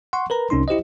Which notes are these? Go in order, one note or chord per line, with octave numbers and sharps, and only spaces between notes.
F#5 C6 C#6
A#4 B4 A#5
C2 C3 C#4 D#4 C6
E4 G4 C5 D#5